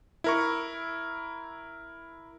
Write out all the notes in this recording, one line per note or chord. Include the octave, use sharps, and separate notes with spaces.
E4 A#4 C#6